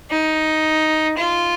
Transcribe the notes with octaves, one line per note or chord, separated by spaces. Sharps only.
D#4
F4